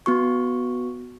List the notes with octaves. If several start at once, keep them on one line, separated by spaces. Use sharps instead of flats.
B3 F#4 C#6